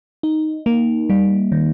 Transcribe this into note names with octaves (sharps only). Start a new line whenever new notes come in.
D#4
A#3
G3
D#3